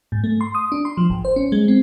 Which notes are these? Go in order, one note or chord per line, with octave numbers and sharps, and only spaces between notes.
G#2
A3
C6
D#6
D4
C6
F3
G#1
C5
C#4
G#3
C4